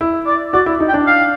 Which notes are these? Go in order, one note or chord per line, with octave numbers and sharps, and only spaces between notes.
E4
D5
F#4 D5
E4
D#4
G5
D4
F5